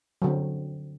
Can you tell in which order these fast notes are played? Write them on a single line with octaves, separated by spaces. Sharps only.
F#3 D3 C4